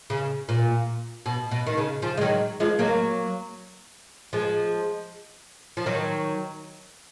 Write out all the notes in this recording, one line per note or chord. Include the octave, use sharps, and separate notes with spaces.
C#3
A#2
B2
B2
D#3
C#3
C#3 F3
G#3
D#3 F#3
F3 G#3
F#3 A#3
F3 G#3
F3
D#3 F#3